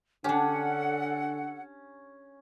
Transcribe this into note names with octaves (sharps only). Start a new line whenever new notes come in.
D3 C#4 D4 G4 A4 F#5